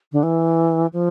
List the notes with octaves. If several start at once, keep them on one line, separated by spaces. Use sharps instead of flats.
D3
E3
F3